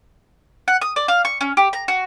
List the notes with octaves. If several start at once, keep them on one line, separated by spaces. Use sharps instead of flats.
F#5
D#6
D5
F5
C#6
C#4
G4
A#5
F#4